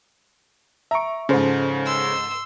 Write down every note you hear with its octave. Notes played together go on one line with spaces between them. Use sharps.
E5 A#5 C#6 D7
G#2 C#3 F3 C#4 A4 C5
C6 E6